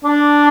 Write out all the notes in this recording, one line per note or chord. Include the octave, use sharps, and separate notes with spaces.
D4